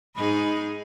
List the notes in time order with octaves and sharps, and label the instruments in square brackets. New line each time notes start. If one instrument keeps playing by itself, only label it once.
[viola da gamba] G#2 D#4 G#4 [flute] B5